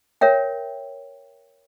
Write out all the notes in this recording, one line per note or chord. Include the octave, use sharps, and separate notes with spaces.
A#4 C#5 E5 G5